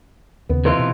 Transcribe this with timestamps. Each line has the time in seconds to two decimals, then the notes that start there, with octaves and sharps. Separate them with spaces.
0.49 D#2 C#3 B3
0.65 C3 E3 F4 B4 D#5 C6
0.79 B2